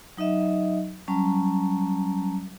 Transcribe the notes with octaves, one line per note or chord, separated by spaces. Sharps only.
F#3 D#4 D#5 E5
F#3 G3 C#4 A5 A#5